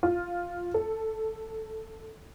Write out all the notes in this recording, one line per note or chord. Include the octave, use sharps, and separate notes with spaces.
F4
A4